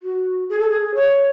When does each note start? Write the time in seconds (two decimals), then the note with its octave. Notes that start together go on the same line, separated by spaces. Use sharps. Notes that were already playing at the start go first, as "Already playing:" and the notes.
0.03 F#4
0.49 G#4
0.59 A4
0.70 G#4
0.95 C#5